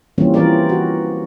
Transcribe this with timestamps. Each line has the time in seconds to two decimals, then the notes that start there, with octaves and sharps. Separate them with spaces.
0.18 E3 F3 G3 A#3 C4 C#4
0.34 E3 F3 C4 A#4 D5
0.69 F#4